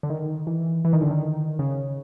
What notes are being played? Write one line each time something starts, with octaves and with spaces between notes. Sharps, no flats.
D3
D#3
E3
E3
D#3
D3
D#3
C#3